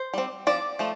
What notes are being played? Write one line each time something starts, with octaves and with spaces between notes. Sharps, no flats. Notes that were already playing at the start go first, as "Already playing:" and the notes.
Already playing: C5
G3 C4
F3 C4 D5
F3 A3